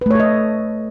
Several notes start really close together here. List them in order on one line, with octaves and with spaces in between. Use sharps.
B4 A3 C#5 A4 D#5